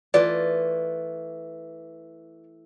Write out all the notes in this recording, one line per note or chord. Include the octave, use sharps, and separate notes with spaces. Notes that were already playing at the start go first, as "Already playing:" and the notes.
E3 A3 F4 D5